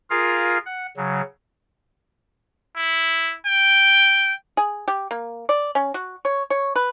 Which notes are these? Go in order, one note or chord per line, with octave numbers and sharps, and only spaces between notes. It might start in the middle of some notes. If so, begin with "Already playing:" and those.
F4 G#4 A#4 F5
F#5
C#3 F#3
E4
G5
G#4
G4
A#3
D5
C#4
F#4
C#5
C#5
B4